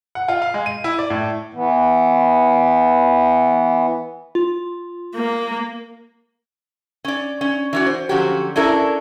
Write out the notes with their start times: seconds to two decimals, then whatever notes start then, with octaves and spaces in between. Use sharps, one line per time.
0.15 F#5
0.28 F4
0.42 F5
0.54 G#3
0.66 D#7
0.84 E4
0.99 D5
1.10 A2
1.54 E3 B3
4.35 F4
5.16 A#3
7.05 C#4 D5
7.41 C#4
7.73 E3 C#4 F#4
7.86 C5
8.09 D3 F3 F#3 C#4 F#4 G4
8.56 C#4 D4 E4 A4 A#4 C#5